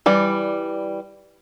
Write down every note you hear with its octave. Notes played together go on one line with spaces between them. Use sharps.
E3 G3 D5